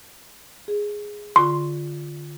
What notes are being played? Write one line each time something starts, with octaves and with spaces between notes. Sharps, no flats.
G#4
D3 F4 C6 C#6